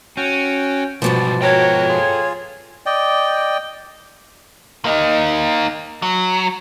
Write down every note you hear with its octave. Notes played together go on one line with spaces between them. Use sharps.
C#4 F#4 G5
B1 G#2 B2 F3 G3 D5
F#4 A4 A#4 C#5 G5
F4 G#4
D5 D#5 G5
A#3 D#4
F#3